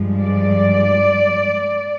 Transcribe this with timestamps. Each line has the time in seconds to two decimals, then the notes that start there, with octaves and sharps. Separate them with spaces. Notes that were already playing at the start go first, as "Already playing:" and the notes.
Already playing: G2 F3 G#3
0.21 D5